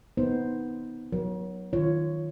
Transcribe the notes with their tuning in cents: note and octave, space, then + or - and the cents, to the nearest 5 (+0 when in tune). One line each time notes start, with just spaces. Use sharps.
B3 +0 D#4 +10 C5 +0
F#3 +0 A#4 +40 C#5 +0
D#3 +0 F4 -20 C#5 +0